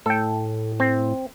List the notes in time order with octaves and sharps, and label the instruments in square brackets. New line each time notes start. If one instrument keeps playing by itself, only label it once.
[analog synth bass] A2 [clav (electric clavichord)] A4 G5
[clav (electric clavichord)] C4